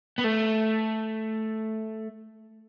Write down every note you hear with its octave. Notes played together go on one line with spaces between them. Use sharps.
B3
A3